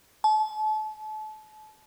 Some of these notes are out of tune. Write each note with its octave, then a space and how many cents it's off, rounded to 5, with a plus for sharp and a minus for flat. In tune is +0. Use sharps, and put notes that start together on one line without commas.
A5 -35